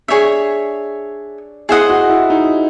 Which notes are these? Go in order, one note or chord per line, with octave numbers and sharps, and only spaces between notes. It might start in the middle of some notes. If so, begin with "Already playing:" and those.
D4 G#4 C#5 E5
E4 G#4 C5 D#5 F#5
F#4
E4
D#4